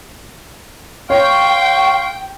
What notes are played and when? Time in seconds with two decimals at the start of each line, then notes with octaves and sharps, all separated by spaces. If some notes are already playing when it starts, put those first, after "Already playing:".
1.10 C#5 F5 G5 C6 C#6